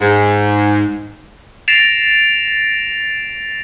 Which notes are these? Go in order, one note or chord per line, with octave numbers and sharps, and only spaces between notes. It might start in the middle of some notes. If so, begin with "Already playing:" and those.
G#2
A6 A#6 C7 D7 E7 F7